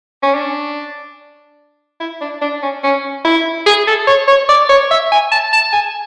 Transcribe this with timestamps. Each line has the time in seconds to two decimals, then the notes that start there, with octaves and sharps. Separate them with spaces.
0.23 C#4
0.35 D4
2.00 E4
2.21 D4
2.42 D4
2.62 C#4
2.83 C#4
3.25 E4
3.66 G#4
3.87 A4
4.07 C#5
4.28 C#5
4.49 D5
4.69 C#5
4.91 E5
5.12 G#5
5.32 A5
5.53 A5
5.73 G#5